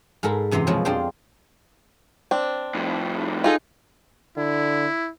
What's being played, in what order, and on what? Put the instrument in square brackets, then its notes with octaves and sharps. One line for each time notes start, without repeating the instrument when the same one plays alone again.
[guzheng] G#2 G#3 A4 A#4 B5
F#2 C3 E3 A#5 C6
B2 F3 F#3 G#3
F2 G#3 D4 F4 G5 C6
[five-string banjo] C4 D4
[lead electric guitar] F2 A2
[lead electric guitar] D#4 [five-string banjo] F4 G#4 A4
[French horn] D3 [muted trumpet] E4